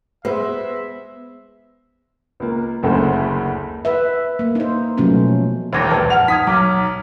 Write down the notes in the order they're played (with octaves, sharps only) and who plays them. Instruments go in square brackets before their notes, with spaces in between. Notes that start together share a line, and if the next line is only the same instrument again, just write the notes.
[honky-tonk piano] G#3 [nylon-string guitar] B3 [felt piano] C5 [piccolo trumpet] E5
[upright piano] C#2 A#3
F#1 D2 C#3 G#3 A4 C5
[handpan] B4 E5
A#3
D#4 C5
B2 F3 F#3 A3 B3 C#4
[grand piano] E1 D#2 [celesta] C5 G#6 A#6
[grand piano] A#1 [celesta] B4 F5 A5
[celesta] F#5 F6 [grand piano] F7
[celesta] D#4 G#6 [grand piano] D#6 B6
[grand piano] B1 [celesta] A#5 D6 F6